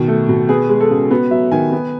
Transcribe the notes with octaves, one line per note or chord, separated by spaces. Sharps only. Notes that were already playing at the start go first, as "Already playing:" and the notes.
Already playing: B2 D#3
A3
B2
B3 G#4
G#3
A4
C#3
B3 F#4
F#3 E5
D#3 G#5
B3